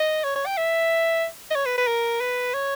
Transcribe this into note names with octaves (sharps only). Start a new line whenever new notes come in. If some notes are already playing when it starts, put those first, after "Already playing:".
Already playing: D#5
C#5
C#5
G5
E5
D#5
C#5
B4
B4
A#4
B4
C#5